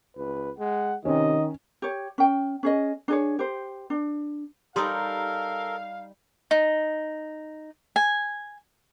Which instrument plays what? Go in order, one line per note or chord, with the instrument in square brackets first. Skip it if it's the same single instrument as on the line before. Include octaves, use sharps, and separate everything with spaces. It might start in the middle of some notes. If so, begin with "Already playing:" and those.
[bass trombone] C#2 [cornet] B4
[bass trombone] G#3 [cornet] F#5
[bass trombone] C3 [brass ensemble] D#3 [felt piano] C#4 [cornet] D#5
[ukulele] G4 C#5
C#4 G5
C#4 G#4 D#5
D4 G#4 C#5
G4 C5
D4
[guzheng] G3 D#4 [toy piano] G4 C6 D#6 [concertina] A4 A#4 [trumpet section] F5
[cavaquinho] D#4
G#5